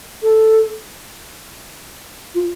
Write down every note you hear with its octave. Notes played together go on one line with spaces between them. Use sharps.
A4
F4